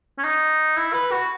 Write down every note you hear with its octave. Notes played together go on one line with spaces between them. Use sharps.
C#4
D#4
E4
B4
F#4